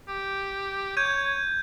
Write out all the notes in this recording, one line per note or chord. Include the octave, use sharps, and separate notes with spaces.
G4
C#5 G6 G#6 D#7